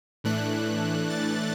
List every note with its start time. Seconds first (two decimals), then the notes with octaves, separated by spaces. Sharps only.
0.24 A2 E3 A3 D4 F#6
1.10 A6